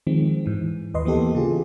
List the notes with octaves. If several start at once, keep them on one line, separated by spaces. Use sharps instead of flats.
D#3 F3 G#3 C4
G#2 E3
D#2 B4 D#5 C6
E3 A#3 B3 G4 A4
C#3 E3 F4 G4 G#4